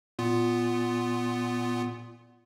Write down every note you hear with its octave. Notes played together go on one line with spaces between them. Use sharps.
A#2 B3 F4